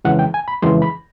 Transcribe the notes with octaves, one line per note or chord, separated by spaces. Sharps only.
F2 C#3 E3 G#3 F#5
G5
G#5
B5
F2 C#3 E3 G#3 C6
B5